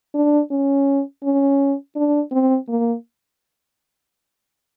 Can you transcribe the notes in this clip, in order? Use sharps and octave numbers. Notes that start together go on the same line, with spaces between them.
D4
C#4
C#4
D4
C4
A#3